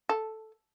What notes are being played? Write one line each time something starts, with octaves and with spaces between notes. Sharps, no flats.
A4